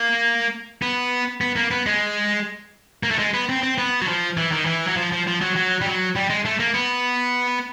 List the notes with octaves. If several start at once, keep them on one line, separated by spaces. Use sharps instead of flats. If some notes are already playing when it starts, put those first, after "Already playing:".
Already playing: A#3
B3
B3
A#3
B3
G#3
A#3
A3
G#3
B3
C4
C4
B3
F#3
F3
E3
D#3
E3
F#3
F3
F3
F3
F#3
F#3
G3
F#3
G3
G#3
A3
A#3
B3